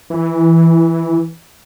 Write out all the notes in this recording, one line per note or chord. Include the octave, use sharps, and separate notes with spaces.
E3